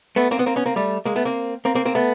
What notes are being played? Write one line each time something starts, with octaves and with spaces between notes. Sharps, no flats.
A3 B3
A#3 C4
B3
A#3 C4
B3 C#4
A#3 C4
G3 A3
G#3 A#3
A3 B3
A#3 C4
A#3 C4
A#3 C4
A#3 C4
A3 B3